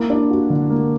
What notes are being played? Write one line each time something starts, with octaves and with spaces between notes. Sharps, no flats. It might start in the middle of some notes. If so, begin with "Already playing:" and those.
Already playing: A#3 E4
D4
F#4
D3
A#3